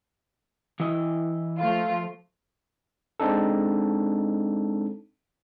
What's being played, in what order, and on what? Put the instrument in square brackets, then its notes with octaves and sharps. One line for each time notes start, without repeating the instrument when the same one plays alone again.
[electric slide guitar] E3 E4 D#5
[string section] F3 A3 F4
[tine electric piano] G#3 C4 D4 D#4 A4